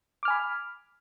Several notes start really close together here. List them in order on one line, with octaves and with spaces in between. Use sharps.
D6 F6 G#5 B5